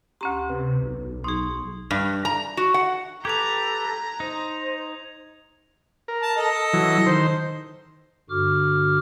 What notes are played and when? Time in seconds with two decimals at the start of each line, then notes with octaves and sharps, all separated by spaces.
0.21 D2 C#4 G4 A#5 C6
0.50 C3 B4
0.83 B1
1.24 D#4 G#4 C6 C#6
1.91 G2
2.25 A#5
2.57 F#4
2.74 F#5
3.25 G4 A4 B4 A#5 G#6 F7
4.20 D#4 C5
6.08 A#4
6.22 A5
6.37 A4 D#5
6.73 E3 F#3
7.06 D#3 C5
8.30 G2 D3 F#4 D6 F6